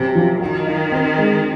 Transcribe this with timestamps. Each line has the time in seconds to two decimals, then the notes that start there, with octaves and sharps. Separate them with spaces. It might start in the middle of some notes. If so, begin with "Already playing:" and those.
Already playing: F#2 C3
0.15 F3
0.41 D#3 F#4
0.66 D#4
0.92 C4
1.18 G#3